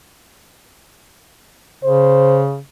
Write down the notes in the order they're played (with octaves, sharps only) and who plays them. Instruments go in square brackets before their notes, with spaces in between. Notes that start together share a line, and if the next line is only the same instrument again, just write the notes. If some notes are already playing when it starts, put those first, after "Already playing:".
[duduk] C#3 [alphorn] C5